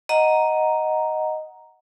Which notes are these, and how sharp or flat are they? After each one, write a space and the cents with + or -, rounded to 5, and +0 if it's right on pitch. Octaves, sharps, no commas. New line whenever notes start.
D#5 +0 F#5 +0 A#5 +0